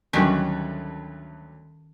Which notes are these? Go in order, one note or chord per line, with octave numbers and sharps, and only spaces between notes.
D2 G2 D#3 F#3 C#4 G4